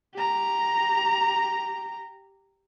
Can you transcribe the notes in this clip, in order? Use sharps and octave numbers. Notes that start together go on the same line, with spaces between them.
G4 A#5